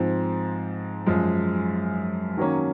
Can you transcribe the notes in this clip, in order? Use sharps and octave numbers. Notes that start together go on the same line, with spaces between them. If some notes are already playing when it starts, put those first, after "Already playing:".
Already playing: G#2 F3 C4
F#2 F3 G#3
D#3 F#3 A#3 C#4